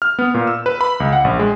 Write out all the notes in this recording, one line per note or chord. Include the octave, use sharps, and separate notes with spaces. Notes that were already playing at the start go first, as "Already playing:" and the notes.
F6
B3
A#2
E6
B4
B5
C#2
F#5
A#1
G#3